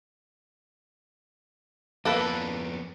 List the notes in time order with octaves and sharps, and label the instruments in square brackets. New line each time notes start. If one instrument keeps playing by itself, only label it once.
[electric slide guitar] F2 B3 [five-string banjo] A#3 A4 B4